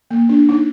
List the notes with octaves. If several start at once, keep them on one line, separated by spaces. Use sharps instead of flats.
A#3
D4
D#4